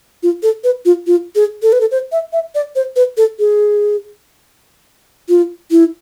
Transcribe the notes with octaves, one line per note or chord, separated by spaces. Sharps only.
F4
A4
B4
F4
F4
G#4
A4
B4
A4
C5
E5
E5
D5
C5
B4
A4
G#4
F4
E4